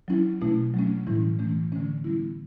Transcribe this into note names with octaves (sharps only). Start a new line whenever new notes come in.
F#3 C#4 E4
B2 A3 C#4 E4
F#3 A3 C#4
A2 E3 G3 C#4 E4
E3 A3 C#4
D3 A3 C#4
G3 B3 E4